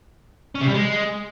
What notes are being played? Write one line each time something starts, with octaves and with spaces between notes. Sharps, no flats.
C#4
C3
G3
G#3